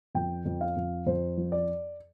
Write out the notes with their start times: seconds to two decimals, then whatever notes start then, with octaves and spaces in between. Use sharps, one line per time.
0.15 F2 G5
0.45 F2
0.61 F5
0.76 F2
1.06 F2 C5
1.37 F3
1.52 D5